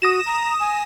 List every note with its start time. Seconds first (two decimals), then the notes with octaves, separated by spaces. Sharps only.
0.02 F#4 D#6 A#6 E7
0.26 A#5
0.60 G#5